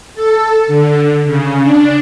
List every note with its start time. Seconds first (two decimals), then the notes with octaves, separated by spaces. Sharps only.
0.14 A4
0.67 D3
1.26 C#3
1.62 D4